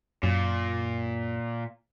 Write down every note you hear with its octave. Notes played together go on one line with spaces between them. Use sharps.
F#2 A#2